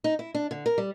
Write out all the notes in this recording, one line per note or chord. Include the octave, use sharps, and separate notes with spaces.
D#4
E4
D4
D3
A#4
G3